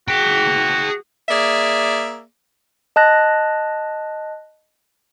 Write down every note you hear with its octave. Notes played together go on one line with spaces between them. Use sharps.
F#4 G#4 G5
A#3 G#4 D5 E5
D#5 A5 F#6 A#6